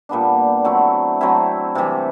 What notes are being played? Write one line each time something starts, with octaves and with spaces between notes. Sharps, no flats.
A#2 G3 B3 D4
F#3 A3 C4 E4
F#3 A3 C4 E4
C3 E3 G3